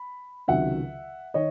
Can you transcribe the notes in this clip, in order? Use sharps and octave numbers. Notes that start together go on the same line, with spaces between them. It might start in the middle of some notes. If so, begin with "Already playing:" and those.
Already playing: B5
C#2 C3 D#3 F#3 E5 F#5
D#3 C#5 D#5